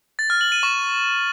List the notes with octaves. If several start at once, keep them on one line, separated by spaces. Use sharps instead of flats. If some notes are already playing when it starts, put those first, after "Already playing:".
A6
F6
F#7
D#7
C#6